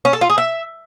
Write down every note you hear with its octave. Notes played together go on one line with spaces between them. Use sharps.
C#4
A4
F4
G#4
E5